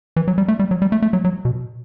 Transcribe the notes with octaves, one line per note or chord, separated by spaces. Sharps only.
E3
F#3
G3
A3
G3
F#3
G3
A3
A3
F#3
F#3
B2